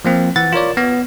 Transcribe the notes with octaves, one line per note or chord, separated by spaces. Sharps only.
F3 A#3 C4
E3 F#5 A6
F4 A#4 C#5 D5
B3